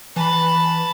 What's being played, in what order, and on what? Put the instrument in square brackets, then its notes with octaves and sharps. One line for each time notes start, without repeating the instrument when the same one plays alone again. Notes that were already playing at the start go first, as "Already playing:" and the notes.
[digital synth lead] E3 [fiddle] A5 B5